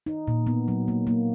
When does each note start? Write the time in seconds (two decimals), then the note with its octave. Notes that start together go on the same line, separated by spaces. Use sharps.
0.06 D#4
0.28 A#2
0.47 B3
0.68 F#3
0.88 A#3
1.07 A#3